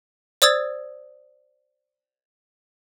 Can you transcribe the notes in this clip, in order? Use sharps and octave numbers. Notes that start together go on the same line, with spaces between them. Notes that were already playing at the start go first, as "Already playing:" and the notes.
C5 D5 D#6 E6 G#6 A6